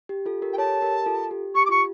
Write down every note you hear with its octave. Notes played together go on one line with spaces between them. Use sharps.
G4
F4 A4
G4 A#4
G5
A4 C#5 A5
G4 A#4
F4 A4
G4
G4 C#6
D6
F4 C#6